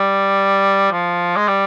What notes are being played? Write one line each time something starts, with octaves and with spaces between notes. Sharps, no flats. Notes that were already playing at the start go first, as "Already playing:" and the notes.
Already playing: G3
F3
G#3
G3